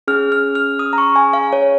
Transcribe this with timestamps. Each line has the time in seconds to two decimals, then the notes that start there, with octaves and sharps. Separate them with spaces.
0.08 C#4 G#4 F6
0.32 F6
0.55 F6
0.79 D#6
0.93 A#5
0.98 C#6
1.16 G#5
1.33 F5
1.53 C#5